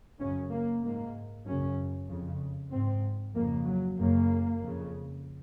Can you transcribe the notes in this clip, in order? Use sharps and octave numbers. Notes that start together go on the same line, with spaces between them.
F#2 C#3 C#4
A#3
G#2 A#3
F#2 C#3 C#4
F2 C#3
G#2 C4
F2 C#3 A#3
F#3
F#2 C#3 A#3
F2 C#3